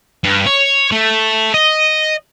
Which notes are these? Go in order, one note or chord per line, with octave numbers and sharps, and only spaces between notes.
G2
C#5
A3
D#5